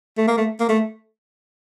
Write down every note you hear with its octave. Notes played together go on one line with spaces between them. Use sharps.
A3
A#3
A3
A#3
A3